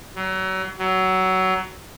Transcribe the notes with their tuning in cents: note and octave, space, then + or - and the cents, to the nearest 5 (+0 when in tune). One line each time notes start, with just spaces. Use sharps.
F#3 +35
F#3 +20